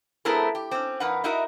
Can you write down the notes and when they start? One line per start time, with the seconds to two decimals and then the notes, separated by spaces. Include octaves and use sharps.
0.25 A3 B3 C4 E4 G#4 A#4
0.55 G4
0.71 C4 C#4
1.00 F2 D#4 A#4 B4 F#5
1.24 D#4 E4 F#4 A#4 D#5 E5